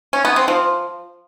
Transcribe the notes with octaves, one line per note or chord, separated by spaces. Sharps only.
C#4
B3
C4
F3